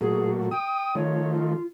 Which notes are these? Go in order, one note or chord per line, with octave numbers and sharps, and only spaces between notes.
A#2 F#3 A3 G#4
G5 D#6
D#3 F3 A3 C#5
F4